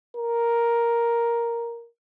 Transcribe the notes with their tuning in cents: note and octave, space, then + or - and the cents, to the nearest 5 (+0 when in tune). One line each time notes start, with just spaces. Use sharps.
A#4 +5